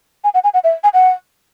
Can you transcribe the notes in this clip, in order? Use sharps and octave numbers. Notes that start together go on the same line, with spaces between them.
G#5
F#5
G#5
F#5
E5
G#5
F#5